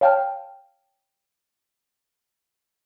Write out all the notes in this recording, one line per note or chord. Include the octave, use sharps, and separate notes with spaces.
C#5 F5 G5 A5 F6